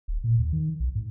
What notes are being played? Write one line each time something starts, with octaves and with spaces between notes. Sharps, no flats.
D#1
A#2
D#2
D#3
B1
G#2